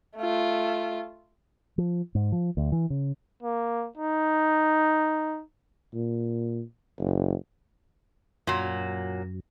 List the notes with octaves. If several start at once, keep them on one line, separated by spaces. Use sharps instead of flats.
A3 F4
F3
G#2
F3
D2
E3
C#3
A#3
D#4
A#2
F#1
F#2 A#2 F#3